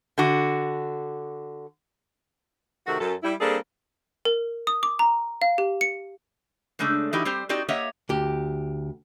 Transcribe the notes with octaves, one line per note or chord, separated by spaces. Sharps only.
D3 F#4
C3 D#3 A3 F#4
F#2 A4
G3 E4
G3 A#3 C4 D4 G#4 A4
A#4
D#6
D6
A#5
F5
G4
C#7
C#3 G#3 A3 D4 A4
E3 D#4 E4 F#4 G4
G3 C4 G4 C5
C4 D#4 F#4 G4 D5
A#3 G4 C#5 D#5 E5 F#5
D2 G4